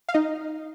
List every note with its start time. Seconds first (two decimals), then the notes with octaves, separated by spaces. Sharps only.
0.09 F5
0.14 D#4 D#5